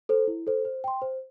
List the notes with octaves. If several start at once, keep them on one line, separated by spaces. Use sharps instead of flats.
A4 C5
E4
A4 C5
C5
G5 C6
C5